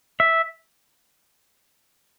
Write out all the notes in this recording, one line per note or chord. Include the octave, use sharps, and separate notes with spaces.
E5